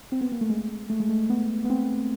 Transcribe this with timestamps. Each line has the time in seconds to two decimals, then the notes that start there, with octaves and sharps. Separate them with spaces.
0.12 C4
0.21 B3
0.32 A#3
0.41 A3
0.49 G#3
0.90 A3
1.00 G#3
1.09 A3
1.30 B3
1.65 B3
1.70 C4